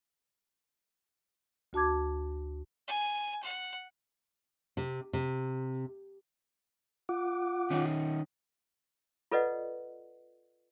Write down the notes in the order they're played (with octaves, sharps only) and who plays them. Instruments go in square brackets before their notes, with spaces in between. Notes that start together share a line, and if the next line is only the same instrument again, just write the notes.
[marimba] D2 F#4 A5 D6 G#6
[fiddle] G#5
F#5
[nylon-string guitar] C3
C3
[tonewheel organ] F4 F#5 D6
[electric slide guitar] D#3 C#4 D#4
[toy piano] F4 A4 B4 D5 D#5 F#5